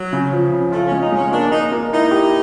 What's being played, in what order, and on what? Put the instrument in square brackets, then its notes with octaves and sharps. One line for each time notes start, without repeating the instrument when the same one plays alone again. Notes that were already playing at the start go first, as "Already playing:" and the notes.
Already playing: [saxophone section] F#3
[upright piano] C#3
F3
C#3
[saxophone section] A3 [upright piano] F4
[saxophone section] C#4
[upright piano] G#3
[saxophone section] D#4
[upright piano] G#3 [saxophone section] C#4
[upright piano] A#3 [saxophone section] D4
[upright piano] A#3 [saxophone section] D#4
[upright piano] A#3
[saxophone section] D#4 [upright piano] E4
[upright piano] G4